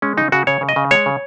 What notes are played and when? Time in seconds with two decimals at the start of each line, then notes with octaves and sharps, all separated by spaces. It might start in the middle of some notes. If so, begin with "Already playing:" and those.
0.02 G#3 C#4
0.17 C#3 D#4
0.32 C#3 F#4
0.47 C#3 C#5
0.61 C#3
0.69 D#5
0.76 C#3
0.91 G#3 C#5
1.06 C#3